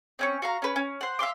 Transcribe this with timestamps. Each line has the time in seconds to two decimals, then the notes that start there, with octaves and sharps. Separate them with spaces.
0.19 C4 C#4 C#6
0.42 F#4 F5 A#5
0.62 C#4 B4
0.76 C#4
1.01 C5 F#5
1.19 E5 F5 C6 D6